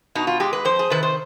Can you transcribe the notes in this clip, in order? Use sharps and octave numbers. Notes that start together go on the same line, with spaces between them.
B2 D#4
F4
G#3 G4
B4
F2 C5
G#4
C3 D#3 B4
C5